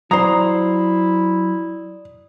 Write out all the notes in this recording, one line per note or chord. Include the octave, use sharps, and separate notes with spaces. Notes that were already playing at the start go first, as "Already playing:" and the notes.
F#3 E4 C5 D5 A#5 D#6